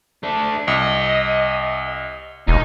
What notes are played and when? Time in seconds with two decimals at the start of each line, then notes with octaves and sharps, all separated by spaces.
0.23 A3 D4
0.68 C2 D#5
2.48 E1 D#4